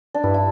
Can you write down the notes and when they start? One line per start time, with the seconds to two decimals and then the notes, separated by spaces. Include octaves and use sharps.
0.14 D4
0.23 G2 E4
0.34 E4